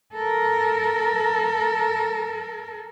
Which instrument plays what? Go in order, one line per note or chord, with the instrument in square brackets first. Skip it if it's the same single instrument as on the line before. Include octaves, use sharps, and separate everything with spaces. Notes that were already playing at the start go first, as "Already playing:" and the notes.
[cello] A4 A#4